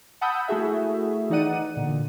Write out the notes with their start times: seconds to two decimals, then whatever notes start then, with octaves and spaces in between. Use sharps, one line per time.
0.21 F#5 A5 B5 D#6 E6 G6
0.48 A3 E4 F#4 G#4 E5
1.30 E3 D#4 D5 F#5 D#7
1.77 A#2 D3